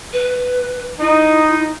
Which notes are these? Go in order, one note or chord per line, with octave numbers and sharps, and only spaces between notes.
B4
D#4 E4